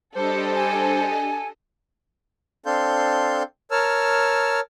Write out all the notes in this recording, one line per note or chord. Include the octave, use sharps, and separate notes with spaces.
G3 D4 G4 A4 C5 D#5
G#5
C4 D4 A4 F5 C6 G6
A#4 C#5 A5 E6 F6